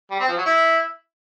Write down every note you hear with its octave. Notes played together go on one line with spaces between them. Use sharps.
G3
C4
F3
F#3
E4